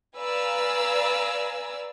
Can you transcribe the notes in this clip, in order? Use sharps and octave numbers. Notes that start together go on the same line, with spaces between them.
B4 D5 F5 G#5 A#5 E6